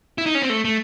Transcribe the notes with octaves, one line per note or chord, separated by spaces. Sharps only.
E4
D#4
C#4
C4
A3
A3